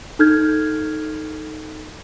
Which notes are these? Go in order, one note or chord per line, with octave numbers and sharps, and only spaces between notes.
D#4 A4 F6 G6 G#6